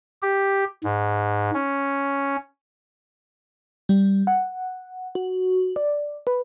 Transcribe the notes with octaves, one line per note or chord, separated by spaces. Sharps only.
G4
G#2
C#4
G3
F#5
F#4
D5
B4